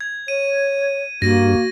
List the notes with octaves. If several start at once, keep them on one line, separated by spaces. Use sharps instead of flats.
G#6
C#5 D#7
G2 A#3 F#4 A#6 D#7